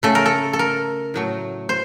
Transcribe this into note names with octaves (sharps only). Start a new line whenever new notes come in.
C#3 A3 A4
A#4
A4
A4
A#4
A2 F#3 A3
C5